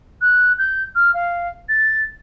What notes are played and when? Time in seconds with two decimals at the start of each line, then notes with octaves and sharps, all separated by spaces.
0.21 F#6
0.59 G6
0.95 F6
1.14 F5
1.69 A6